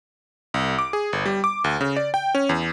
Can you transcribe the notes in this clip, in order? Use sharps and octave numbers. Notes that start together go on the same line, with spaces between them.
C2
D6
G#4
G1
G3
D6
D2
C#3
D5
G5
C#4
E2